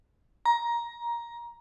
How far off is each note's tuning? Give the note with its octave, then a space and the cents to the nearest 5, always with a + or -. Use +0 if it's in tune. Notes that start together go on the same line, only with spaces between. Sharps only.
A#5 +15